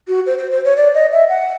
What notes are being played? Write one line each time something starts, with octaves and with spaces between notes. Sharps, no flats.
F#4
C5
C5
C5
C#5
D5
D#5
E5
F#5